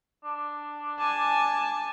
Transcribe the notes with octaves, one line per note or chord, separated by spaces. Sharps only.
D4
G#5 A5